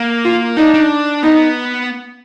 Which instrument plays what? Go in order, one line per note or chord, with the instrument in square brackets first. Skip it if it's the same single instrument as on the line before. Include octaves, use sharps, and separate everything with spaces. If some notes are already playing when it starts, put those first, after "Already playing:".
Already playing: [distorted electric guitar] A#3
[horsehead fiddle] F4
[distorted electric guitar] D4 [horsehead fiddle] D#4
[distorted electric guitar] D4
[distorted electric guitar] B3 [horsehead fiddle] D#4